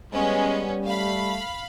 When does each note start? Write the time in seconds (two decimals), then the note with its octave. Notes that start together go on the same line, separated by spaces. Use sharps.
0.13 G3 G#3 B3 C#4
0.86 A3 F5 B5